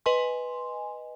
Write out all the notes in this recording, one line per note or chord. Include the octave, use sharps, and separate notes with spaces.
B4 D#5 G#5 C6